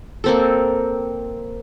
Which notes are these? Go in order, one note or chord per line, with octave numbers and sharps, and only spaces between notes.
A#3 C4 A4